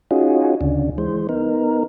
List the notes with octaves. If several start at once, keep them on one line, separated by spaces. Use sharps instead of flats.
C#4 D#4 F4 F#4 G#4
D2 C#3 D4
E3 G#3 C5
B3 D#4 A#4